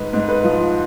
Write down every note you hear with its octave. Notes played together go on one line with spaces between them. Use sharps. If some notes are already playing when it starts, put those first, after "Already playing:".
Already playing: G#2 B4
G#2
B4
F3